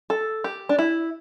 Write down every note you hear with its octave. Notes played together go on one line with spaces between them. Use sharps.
A4
G4
D4
E4